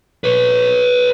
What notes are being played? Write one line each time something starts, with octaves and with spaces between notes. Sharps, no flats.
B4 C#5